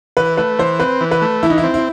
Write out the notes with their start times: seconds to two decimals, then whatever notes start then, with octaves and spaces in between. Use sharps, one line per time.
0.17 E3 B4
0.38 A3 B4
0.59 E3 C5
0.80 C4 B4
1.01 E3
1.11 B4
1.22 A3
1.43 E3 E4
1.50 D#4
1.58 E4
1.64 C4
1.74 E4